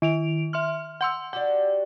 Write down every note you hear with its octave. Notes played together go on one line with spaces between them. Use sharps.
D#3 D7 F7
E5 C6 F6
F#5 C6 E6
D4 F#4 G4 F#5